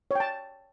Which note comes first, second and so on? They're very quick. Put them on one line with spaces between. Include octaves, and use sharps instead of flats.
C#5 G5 A5